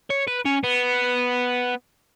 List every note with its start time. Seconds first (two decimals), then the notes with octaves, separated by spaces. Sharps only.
0.10 C#5
0.28 B4
0.46 C#4
0.64 B3